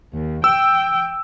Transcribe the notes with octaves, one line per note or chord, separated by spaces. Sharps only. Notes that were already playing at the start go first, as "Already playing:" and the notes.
D#2
G5 E6